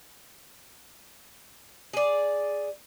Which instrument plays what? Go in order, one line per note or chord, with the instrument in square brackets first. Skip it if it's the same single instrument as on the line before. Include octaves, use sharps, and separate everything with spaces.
[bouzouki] G#4 D5